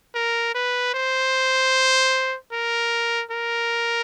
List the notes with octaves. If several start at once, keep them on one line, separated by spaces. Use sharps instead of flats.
A#4
B4
C5
A#4
A#4